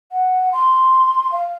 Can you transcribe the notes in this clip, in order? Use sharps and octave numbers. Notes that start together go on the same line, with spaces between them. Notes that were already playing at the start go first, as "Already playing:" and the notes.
F#5
C6
F5